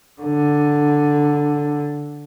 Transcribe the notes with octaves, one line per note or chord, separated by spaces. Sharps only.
D3